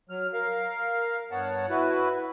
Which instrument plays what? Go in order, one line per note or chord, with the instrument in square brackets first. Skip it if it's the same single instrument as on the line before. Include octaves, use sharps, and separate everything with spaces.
[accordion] F#3 F6
A#4 F5
G2 B3 C#5 F#5 A5
E4 F#4 B4